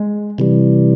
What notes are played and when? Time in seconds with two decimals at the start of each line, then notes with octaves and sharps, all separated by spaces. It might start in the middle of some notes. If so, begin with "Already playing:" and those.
Already playing: G#3
0.38 C3 E3 G3